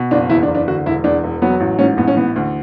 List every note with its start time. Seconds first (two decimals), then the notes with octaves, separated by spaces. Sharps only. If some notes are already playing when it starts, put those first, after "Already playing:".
Already playing: B2
0.11 F#1 D4
0.29 E2 E4
0.43 D4
0.48 F#1
0.55 D4
0.68 D3 F#4
0.86 E1 E4
1.04 E2 D4
1.24 E1
1.42 F#3 B3
1.60 A1
1.79 G#2 C#4
1.97 A1 B3
2.08 C#4
2.17 E3 B3
2.36 D2